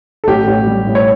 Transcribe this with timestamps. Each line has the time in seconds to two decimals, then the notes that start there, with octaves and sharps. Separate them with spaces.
0.24 A4
0.27 A1 G4
0.47 A1
0.67 G3
0.87 A2
0.95 C#5